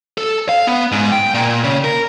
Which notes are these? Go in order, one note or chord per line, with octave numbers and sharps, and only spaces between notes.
A4
F5
B3
G#2
G5
A#2
C#3
A#4